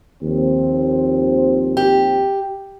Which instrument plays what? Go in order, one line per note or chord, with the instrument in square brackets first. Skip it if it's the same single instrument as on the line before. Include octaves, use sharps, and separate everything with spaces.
[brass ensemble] D#2 F3 C4
[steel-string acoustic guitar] G4